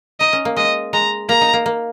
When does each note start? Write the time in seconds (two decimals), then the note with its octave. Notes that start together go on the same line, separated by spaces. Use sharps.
0.20 D#4 D#5
0.33 C#4
0.45 A#3
0.56 G#3 D#5
0.93 G#3 A#5
1.29 A#3 A#5
1.41 D#4
1.53 A#3
1.66 A#3